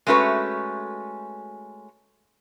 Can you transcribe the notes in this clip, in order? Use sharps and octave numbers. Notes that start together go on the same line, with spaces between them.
G#3 A3 C#4 F#4 B4